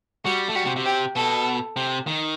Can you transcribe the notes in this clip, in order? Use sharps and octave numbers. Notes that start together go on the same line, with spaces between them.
G3 F#4
A3
G3 F#4
C3
C3
G4
B2 A4
C3
D#3